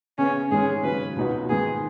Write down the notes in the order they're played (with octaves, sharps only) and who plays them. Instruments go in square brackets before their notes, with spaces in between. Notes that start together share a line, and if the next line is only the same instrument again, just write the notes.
[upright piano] C#3 B3 G#4 [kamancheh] C#4
[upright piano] G#2 D#3 G#3 C#4 [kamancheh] G#4
[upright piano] C#3 F#3 C#4 [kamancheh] B4
[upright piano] C#2 B2 B3 D#4 F#4
[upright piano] G#2 D#3 B3 [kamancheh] G#4